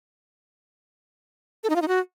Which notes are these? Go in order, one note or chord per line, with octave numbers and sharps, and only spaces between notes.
A4
D#4
F4
D#4
F#4